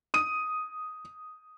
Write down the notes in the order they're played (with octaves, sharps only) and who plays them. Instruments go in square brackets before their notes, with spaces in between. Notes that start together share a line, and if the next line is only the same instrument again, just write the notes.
[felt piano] D#6 D#7